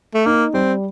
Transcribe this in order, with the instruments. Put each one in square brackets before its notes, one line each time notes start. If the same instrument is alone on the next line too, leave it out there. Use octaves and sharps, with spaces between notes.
[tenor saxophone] A3
[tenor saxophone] A#3 [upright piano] D#4
[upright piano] G3 [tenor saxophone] C4